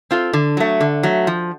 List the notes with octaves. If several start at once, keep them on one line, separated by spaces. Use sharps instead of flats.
C4 F4 A4
D3
F#3 A3
D3
F#3 A3
F3